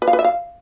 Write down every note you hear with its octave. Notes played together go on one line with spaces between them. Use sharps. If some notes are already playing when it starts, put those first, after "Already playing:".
B4
F5
B4
E5
F5